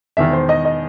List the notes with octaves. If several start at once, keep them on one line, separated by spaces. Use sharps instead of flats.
E1 E2 D#3 E5
C5
D#5
D#5